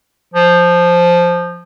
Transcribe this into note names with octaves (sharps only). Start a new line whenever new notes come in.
F3